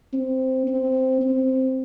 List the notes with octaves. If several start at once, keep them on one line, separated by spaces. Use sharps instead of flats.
C4
C4
C4